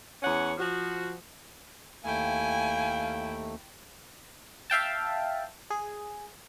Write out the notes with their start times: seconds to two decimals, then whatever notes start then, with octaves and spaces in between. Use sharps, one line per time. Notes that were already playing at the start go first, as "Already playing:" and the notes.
0.22 E2 C#4 C#5 F#5
0.58 F3 F#4
2.05 D#2 A3 E4 F5 G5 G#5
4.70 E5 F5 G5 A5
5.70 G#4